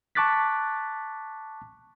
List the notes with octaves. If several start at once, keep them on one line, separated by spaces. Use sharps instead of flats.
A5 C#6 D6 F#6 A6 B6